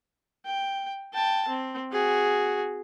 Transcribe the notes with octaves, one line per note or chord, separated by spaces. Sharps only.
G5
G5 A5
C4
F#4 G#4